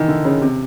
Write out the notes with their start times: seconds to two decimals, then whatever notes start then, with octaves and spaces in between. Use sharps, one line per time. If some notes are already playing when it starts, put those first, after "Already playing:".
Already playing: D#3 E3
0.08 D3
0.25 C#3
0.42 C3